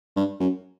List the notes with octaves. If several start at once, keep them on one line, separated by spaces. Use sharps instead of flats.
G2
F#2